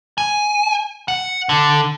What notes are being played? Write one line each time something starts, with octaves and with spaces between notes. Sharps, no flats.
G#5
F#5
D3